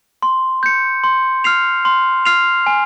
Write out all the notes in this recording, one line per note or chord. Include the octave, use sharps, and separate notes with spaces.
C6
G6 C#7
C6
F6 C7 F7
C6
F6 C7 F7
G#5